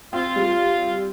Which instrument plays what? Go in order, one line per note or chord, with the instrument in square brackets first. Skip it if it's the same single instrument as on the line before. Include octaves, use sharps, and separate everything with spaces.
[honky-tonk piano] C4 [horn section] F4
[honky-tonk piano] G3